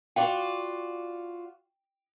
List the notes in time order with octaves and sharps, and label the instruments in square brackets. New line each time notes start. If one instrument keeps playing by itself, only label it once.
[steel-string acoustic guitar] F4 F#4 D5 [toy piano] G5